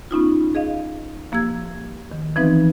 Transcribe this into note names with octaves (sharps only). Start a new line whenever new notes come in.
B3 C#4 D#4 F4
G#4 D#5 F5
F3 A#3 G4 E6 G#6
D#3
E3 F3 B3 C4 D#4 B4